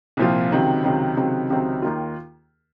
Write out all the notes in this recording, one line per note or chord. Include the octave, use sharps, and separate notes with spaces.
C2 A#2 F3 C4 F4
C#2 C3 D#3 F#3 C4
C#2 C3 D#3 F#3 C4
C#2 C3 D#3 F#3 C4
C#2 C3 D#3 F#3 C4
D#2 D#3 A#3 F4